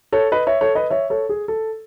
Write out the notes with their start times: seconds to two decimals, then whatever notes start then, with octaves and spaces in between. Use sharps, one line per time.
0.12 A4 C#5
0.32 B4 D#5
0.47 C#5 E5
0.61 A4 C#5
0.75 B4 D#5
0.90 C#5 E5
1.10 A4 C#5
1.29 G#4
1.48 A4